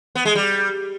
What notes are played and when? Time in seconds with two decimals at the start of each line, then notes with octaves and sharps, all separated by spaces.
0.15 B3
0.25 G#3
0.35 G3